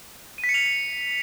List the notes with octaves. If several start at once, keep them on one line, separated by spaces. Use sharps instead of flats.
D#7
B6
C#7
F7